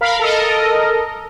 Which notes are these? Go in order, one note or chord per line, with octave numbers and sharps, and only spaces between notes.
A#4 F5 B5
A4 A#4 D#5